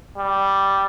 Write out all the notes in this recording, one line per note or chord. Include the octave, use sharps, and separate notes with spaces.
G3